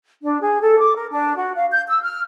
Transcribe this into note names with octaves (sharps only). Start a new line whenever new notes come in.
D4
G#4
A4
D6
A#4
D4
F#4
F5
G6
E6
F6